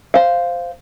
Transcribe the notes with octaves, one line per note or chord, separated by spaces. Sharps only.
C5 F5